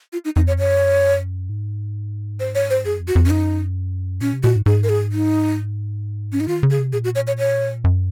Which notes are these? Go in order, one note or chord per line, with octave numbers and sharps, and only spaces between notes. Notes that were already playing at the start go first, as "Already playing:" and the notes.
F4
D#4
F2 D#4
C#5
F#2 C#5
G#2
C5
C#5
C5
F#2 G#4
F2
F#4
F2
C#4
F#2 D#4
A#2 C#4
C3
A#2 F#4
G#2
G#2 G#4
A#4
G#4
D#4
C#4
D#4
D#3 F4
C#3
G#4
C3
A#2 G#4
F#4
C#5
C#5
C#5
F#2